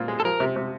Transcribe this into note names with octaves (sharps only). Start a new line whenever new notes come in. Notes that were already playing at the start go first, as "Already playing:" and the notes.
Already playing: A#2 C4
G#3
A4
F3 A#4
C3
C3